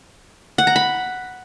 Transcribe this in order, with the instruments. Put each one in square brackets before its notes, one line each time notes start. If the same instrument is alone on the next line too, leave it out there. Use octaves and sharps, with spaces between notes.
[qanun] F#5
A#5
B5